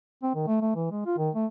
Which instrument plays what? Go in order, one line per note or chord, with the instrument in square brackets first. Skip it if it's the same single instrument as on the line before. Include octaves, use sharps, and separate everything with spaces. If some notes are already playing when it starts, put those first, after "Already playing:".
[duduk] C4
D#3
A3
A3
E3
G#3
F4
D#3
A3